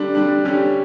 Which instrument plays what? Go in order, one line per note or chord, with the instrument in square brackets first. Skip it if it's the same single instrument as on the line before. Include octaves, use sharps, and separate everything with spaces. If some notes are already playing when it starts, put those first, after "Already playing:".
Already playing: [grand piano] D3 G3 D4
D3 G3 D4
D3 G3 C#4 G4